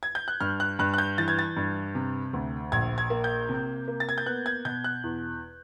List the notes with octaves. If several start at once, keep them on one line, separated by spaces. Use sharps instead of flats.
G#6
G6
F#6
G2 F6
F#6
G2 F#6
F#6
G6
E3 A6
G#6
A6
G2
C3
D2
A#1 G#6
G#6
A#3
G6
C3
A#3
A6
G#6
G6
B3 F#6
G#6
B2 G6
F#6
E2